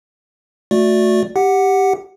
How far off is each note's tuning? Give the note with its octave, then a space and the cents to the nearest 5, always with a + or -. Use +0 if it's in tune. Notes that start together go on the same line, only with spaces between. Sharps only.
A3 +0 F#4 -20 D5 +0
G4 +0 F#5 +0